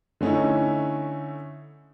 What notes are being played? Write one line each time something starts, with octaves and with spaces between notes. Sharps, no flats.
D3 A3 C#4 D#4 E4